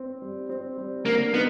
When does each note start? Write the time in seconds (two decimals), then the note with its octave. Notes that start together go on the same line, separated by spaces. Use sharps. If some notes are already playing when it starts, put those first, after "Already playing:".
Already playing: C4
0.22 G3
0.50 C4
0.77 G3
1.05 D3 A#3
1.34 B3 D#4